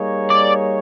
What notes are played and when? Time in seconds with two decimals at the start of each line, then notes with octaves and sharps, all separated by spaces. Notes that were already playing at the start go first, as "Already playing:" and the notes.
Already playing: G3 A#3 D#4 G#4 C#5
0.30 D5